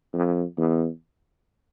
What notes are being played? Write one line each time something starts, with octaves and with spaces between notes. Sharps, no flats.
F2
E2